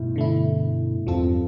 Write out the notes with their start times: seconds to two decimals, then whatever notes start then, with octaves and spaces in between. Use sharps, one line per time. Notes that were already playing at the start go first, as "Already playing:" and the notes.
Already playing: G2 B2 A3 E4
0.16 D3 A3 E4
1.07 E2 G2 F3 C4 F4 A4